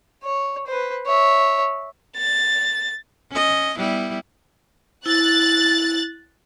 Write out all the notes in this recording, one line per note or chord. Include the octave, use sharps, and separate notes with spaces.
C#5
B4 C5
C#5 E5
A6
C#4 D#5
G3 B3 E4
E4 F#6 A6